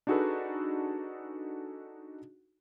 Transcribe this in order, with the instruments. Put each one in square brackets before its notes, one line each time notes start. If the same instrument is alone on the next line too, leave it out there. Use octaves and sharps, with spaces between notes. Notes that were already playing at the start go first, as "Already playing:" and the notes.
[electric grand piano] D4 D#4 F#4 G#4 A4 B4